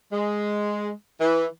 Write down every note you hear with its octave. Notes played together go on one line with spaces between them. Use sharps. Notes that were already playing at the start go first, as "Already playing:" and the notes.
G#3
E3